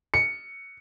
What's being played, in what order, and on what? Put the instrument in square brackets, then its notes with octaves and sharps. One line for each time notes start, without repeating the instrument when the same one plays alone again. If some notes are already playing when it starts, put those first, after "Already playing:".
[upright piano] C#7